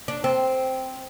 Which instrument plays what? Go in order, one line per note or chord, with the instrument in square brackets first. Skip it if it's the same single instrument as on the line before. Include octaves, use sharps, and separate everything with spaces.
[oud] D4
C4